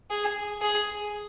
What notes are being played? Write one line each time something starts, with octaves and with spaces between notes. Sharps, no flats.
G#4
G#4